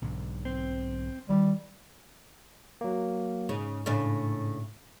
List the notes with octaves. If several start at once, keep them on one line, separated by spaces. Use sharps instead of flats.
B1 G#2 D3
C4
D#3 E3 G3
F#3 A#3
G#2 C#3
A2 C#3 D4